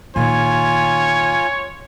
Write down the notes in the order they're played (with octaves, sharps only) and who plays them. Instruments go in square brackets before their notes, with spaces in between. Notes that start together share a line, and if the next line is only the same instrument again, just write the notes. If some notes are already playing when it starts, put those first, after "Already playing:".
[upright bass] A#2 D#3 [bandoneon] F4 G#5 [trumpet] C#5